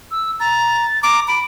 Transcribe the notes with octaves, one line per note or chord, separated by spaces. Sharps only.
E6
A#5 A6
A#5 D6
B5 D7